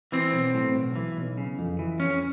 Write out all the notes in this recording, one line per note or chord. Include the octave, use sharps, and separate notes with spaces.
E3 C4
B1
A2
B1
E3
B1
C#3
F2
E3
F2 C#4